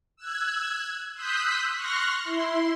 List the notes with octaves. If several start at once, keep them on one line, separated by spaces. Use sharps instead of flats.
E6 F#6 G#6
C6 D#6 E6 F#6 G6 B6
C6 C#6 F6 F#6 A#6
E4 C6